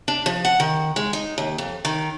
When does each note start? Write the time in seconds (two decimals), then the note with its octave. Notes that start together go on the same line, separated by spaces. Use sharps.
0.08 D4
0.26 F3
0.45 F#5
0.60 D#3
0.96 G#3
1.13 D#4
1.38 D#2
1.58 F2
1.85 D#3